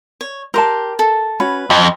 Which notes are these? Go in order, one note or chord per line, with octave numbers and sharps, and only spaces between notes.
C#5
G4 A#4 A5 C6
A4
C#4 F#4 B4 B5
F2 D#5 G5 B5